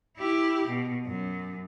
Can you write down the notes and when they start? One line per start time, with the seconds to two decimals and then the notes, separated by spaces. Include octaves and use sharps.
0.17 E4 G4
0.68 B2
1.05 F#2